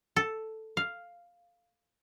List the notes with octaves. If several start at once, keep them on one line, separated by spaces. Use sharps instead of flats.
A4
F5